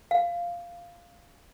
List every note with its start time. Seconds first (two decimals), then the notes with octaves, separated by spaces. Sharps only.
0.11 F5